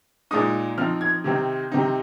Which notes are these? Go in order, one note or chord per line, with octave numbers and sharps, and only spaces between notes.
A#2 G#3 D#4 D#6
F3 C4 D#4 F6
G#6
C3 D#3 C4 D#4
C3 D#3 C4 D#4